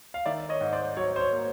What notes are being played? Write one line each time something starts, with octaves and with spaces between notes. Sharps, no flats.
F5
D#3 D5 E5
C#5 D#5
G#2
C5 D5
F#3 C#5
C5
C#5
A#3